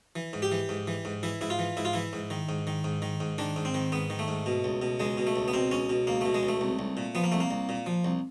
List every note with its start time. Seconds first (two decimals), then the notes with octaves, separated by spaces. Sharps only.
0.16 E3
0.33 G#2
0.42 G4
0.52 E3
0.69 G#2
0.87 E3
1.05 G#2
1.23 E3 E4
1.41 G#2 E4
1.50 F4
1.59 E3
1.77 G#2 E4
1.85 F4
1.93 E3 E4
2.13 G#2
2.30 D#3
2.49 G#2
2.67 D#3
2.84 G#2
3.02 D#3
3.20 G#2
3.38 D#3 D4
3.56 G#2
3.65 C4
3.74 D#3
3.92 G#2 B3
4.10 D#3
4.19 A3
4.28 G#2
4.46 B2
4.64 C#2
4.82 B2
5.00 C#2 G#3
5.18 B2
5.27 A3
5.36 C#2
5.48 B3
5.54 B2 C4
5.71 C#2 C#4
5.89 B2
6.07 C#2 A#3
6.21 B2 A3
6.34 G#3
6.43 C#2
6.48 A3
6.61 C2
6.79 C2
6.97 A#2
7.15 F3 B3
7.24 A#3
7.32 C2 A3
7.40 A#3
7.51 C2
7.69 A#2
7.86 F3
8.05 C2